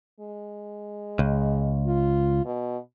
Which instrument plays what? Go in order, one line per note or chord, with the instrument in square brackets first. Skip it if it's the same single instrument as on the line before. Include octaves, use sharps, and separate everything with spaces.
[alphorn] G#3
[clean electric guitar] C#2
[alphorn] F4
B2